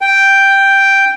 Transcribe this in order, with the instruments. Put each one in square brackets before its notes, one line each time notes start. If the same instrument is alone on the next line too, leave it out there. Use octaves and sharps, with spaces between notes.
[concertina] G5